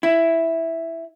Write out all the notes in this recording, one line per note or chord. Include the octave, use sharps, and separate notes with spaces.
E4